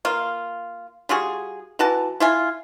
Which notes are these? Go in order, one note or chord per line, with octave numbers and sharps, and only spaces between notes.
A#3 F4
G3 F4 F#4 G#4
E3 F#4 A5
E4 F4 G#5